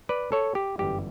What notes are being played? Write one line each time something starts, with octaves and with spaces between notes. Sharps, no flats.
B4 D5
A4 C#5
G4
G1 F#2 E3 G3 G4